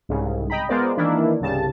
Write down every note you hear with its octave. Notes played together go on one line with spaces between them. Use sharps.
C2 G#2 C#3
D#5 G5 A#5 B5
G#3 B3 F4 A#4 C5 D5
D#3 E3 A#3 D4 E4
C2 G2 C#3 G3 A5